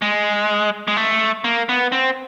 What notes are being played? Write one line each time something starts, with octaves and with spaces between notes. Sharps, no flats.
G#3
G#3
A3
A#3
B3
C4